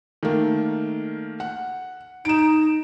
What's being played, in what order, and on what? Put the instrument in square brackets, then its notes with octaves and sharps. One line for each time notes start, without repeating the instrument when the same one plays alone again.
[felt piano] D#3 A3 A#3
F#5
[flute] D#4 [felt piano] D7 E7